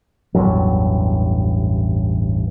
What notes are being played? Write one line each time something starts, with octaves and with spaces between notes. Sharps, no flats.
A1 E2 G2 F#3